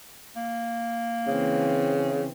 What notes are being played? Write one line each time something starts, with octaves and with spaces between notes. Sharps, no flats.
A#3
C#3 E3 C4